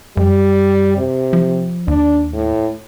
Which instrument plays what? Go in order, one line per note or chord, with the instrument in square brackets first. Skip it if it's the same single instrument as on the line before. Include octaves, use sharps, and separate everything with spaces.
[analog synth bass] F#2 [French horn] G3
[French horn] C3
[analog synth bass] F3
[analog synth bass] D#2 [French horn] D4
[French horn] A2